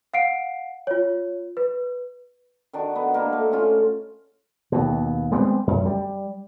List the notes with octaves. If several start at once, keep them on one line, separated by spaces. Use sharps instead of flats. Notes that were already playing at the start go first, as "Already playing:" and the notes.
F5 F#5 C7 D7
F4 C#5
B4
D#3 D4 F#4
B3
A#3 D4 C5
A3
C#3 C#4 F4
D#2 B2
G3 G#3 B3 C4
F#2
G3